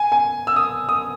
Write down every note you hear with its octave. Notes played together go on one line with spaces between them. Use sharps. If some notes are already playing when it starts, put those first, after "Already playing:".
Already playing: G#5
G#5
E6
D#6
D#6